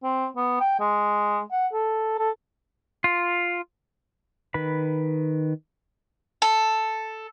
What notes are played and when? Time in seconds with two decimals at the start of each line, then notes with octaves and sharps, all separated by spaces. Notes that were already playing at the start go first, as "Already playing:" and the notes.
0.03 C4
0.36 B3
0.60 G5
0.80 G#3
1.52 F#5
1.73 A4
2.19 A4
3.04 F4
4.54 D#3 B4 B5
6.42 A4